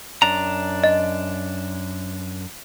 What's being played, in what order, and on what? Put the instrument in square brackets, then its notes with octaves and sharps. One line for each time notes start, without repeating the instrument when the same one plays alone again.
[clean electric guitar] F#2 D4 A#5
[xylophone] D#5